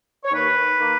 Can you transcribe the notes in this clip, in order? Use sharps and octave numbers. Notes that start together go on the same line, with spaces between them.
C#5
D#2 B4
D#3 A#3